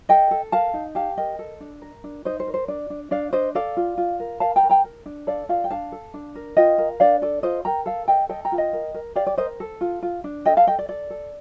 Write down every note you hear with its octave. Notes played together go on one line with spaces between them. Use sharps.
A4 D#5 G5
A4
A#4 F5 A5
D#4
G4 F5 A5
A#4 D#5 G5
A4
D4
A#4
D4
D#4 C5 D#5
C5
A#4
C5
D4 D5
D4
D4 D5 F5
D4 C5 D#5
A4 D5 F5
F4
F4
A#4
A#4 F5 A5
G5 A#5
A#4
G5 A#5
A#4
D4
A4 D5 F5
F4 D5 F5
G5
D4 F5 A5
A4
D4
A#4
F4 D#5 G5
A#4
D4 D5 F5
A4 D5
F4 C5 D#5
A#4 G5 A#5
A4 F5 A5
A4 D#5 G5
A4 D#5 G5
G5 A#5
F4
D#5 G5
A#4
A#4
G4 D5 F5
D5
A#4 C5 D#5
A4
F4
F4
D4
A4 D#5 G5
F5 A5
A4 D#5 G5
D5
A4 D5
A4